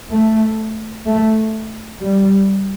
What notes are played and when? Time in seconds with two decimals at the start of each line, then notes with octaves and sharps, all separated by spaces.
0.11 A3
1.06 A3
2.01 G3